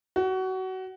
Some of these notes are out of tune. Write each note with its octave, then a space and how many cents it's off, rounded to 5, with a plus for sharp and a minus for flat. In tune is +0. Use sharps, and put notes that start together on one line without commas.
F#4 +25